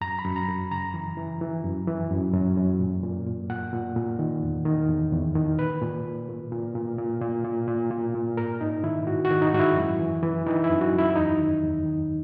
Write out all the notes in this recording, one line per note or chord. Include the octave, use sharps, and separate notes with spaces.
F#2 A#5
B5
F#2
A#5
F#2
C#3 A#5
E3
E3
E3
F#2
E3
F#2
F#2
F#2
A#2
A#2
A#2
A#2 F#5
A#2
A#2
D#3
E2
D#3
E2
E2
D#3
A#2 B4
A#2
A#2
A#2
A#2
A#2
A#2
A#2
A#2
A#2
A#2
A#2
G#2 A#4
G#2 D#4
D#3 E4
G#2 F#4
F#4
D#3
D#4
G#2 F#4
E4
F#2
E3
E3
E3 D#4
E4
F#2
F#4
F#2
E4
E4
E2 D#4
D#3
E2
D#3